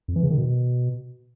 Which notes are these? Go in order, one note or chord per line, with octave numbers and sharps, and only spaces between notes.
F2
E3
C#3
D#3
B2